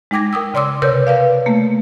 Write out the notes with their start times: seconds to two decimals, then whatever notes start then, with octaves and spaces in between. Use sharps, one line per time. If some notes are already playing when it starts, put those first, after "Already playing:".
0.11 G#3 D#4 G5 D6 G#6 A#6
0.33 A#4 G5 D#6 E6
0.54 C#3 D5 C6 D6 E6
0.82 C3 A#4 B4 C#5 D5 G6
1.07 A#4 B4 D5 F5
1.46 A3 A#3